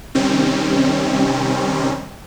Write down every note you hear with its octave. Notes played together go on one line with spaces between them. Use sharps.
C3 D#3 G3 C4 C#4